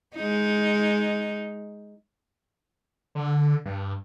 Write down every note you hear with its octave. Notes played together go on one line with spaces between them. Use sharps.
G#3 D#4
D3
G2